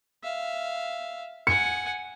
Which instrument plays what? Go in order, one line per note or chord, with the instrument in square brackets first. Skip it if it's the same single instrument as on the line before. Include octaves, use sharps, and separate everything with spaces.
[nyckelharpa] E5 F5
[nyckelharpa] F#5 G#5 [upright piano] C#7